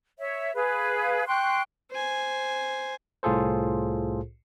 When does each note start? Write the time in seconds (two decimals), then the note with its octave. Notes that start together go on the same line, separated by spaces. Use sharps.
0.19 C#5 E5
0.55 G#4 B4 F5
1.27 G5 C6 C#6 F#6
1.91 C5 G#5
3.23 C2 A2 F4 G#4 A4 C5